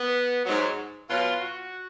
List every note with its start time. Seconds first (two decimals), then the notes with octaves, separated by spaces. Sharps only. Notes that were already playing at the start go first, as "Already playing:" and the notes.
Already playing: B3
0.45 G#2 F#3
1.09 B2 F#3 F4
1.40 F#4